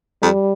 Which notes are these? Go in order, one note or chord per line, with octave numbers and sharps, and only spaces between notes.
F2 G3